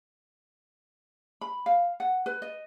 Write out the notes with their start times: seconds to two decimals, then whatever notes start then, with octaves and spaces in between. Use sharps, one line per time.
1.41 B5
1.66 F5
2.00 F#5
2.26 B4
2.42 D#5